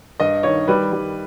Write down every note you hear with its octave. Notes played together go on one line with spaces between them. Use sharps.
G2 D#5
D#3 C#5
G3 B4
G3